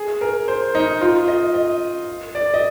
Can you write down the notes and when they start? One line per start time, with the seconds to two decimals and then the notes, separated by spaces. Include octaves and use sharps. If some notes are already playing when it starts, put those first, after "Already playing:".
Already playing: G#4
0.21 A#4
0.48 C5
0.75 D#4
1.01 F4
1.28 D#5
1.54 D#5
2.35 D5
2.54 D#5